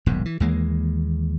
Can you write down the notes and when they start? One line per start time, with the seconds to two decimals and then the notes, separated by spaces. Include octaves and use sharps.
0.06 D#1 B1 G#2
0.25 E3
0.40 D#2 E3 G#3 A#3